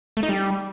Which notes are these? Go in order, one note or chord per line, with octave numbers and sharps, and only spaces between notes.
A3
D#4
G3